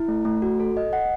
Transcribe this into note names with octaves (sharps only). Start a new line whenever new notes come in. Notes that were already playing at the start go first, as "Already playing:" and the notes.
Already playing: E4
A3
A3
F#4
A4
D#5
F#5